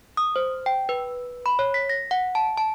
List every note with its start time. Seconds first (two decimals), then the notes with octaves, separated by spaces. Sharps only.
0.17 D#6
0.36 C5
0.66 G5
0.89 B4
1.46 B5
1.59 C#5
1.74 B6
1.89 A#6
2.11 F#5
2.35 A5
2.58 A5